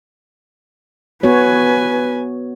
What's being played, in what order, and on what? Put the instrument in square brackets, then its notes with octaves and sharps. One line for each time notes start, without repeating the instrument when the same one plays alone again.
[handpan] B3 F#4 C#5 [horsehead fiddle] B4 G#5